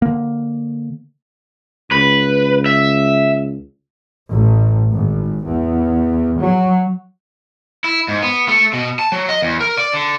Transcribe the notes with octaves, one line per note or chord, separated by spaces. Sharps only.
D3 A#3
C#2 B4
E5
A1
G#1
E2
F#3
E4
G#2
B3
A3
B2
A5
F#3
D#5
E2
A#4
D5
D3